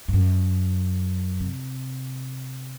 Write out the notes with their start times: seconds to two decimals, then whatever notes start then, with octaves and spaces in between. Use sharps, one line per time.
0.08 G2
0.13 F#2
1.40 C3